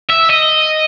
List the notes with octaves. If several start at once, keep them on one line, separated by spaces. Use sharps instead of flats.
E5
D#5